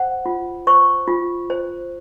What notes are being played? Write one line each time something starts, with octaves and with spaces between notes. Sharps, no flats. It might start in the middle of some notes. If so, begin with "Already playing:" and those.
Already playing: C5 F#5
F4
C5 C#6
F4
C5